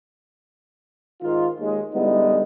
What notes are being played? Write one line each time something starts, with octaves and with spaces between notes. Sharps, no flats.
G#2 D#3 D#4 F4
D#2 G#3
D3 G3 G#3 B3 D#4 E4